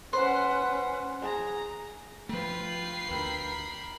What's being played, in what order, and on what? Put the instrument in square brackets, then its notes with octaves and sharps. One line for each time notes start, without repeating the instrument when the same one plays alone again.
[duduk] C#4 [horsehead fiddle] B4 F#5 [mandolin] C5
[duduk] G#4 [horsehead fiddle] A#5
[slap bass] F3 A3 [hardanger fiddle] F4 B4 [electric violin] G5 C7
[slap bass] D2 [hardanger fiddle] A#4 B5